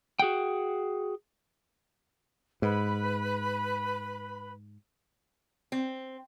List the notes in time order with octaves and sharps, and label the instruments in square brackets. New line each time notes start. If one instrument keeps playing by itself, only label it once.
[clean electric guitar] F#4 G#4 F#5 G5
[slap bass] G#2 [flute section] B4 B5
[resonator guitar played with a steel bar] C4